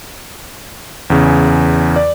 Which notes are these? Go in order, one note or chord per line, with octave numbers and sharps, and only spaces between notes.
E2 C#3
D5